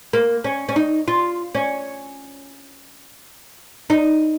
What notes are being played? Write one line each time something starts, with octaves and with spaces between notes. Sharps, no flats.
A#3
C#4
C#4
D#4
F4
C#4
D#4